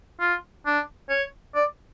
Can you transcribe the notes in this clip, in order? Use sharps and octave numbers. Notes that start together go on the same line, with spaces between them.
F4
D4
C#5
D5